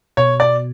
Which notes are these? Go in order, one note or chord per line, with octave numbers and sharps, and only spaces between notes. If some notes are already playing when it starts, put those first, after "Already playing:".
B2 C#5
D5